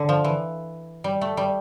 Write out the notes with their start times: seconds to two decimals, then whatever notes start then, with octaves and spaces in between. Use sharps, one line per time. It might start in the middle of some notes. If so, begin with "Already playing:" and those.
Already playing: D3
0.09 F3
0.24 E3
1.04 G3
1.21 A3
1.37 G3